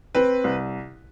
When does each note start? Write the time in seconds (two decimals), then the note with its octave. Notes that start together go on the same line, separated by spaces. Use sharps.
0.15 C4 B4
0.44 C2